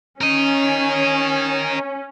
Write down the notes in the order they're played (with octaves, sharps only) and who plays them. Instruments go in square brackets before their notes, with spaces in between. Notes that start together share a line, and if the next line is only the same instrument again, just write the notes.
[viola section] C#4 [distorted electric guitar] A#4 D#5